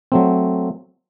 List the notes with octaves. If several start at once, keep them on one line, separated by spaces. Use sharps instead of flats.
F#3 A3 C4